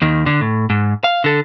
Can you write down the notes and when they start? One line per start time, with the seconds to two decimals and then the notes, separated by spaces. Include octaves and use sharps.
0.02 D#2 D#3
0.26 D3
0.41 A2
0.70 G#2
1.04 F5
1.24 D3 A4